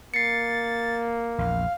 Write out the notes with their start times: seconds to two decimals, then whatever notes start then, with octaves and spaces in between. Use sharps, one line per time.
0.14 A#3 A6 C7 C#7
1.38 A#1 E2 F5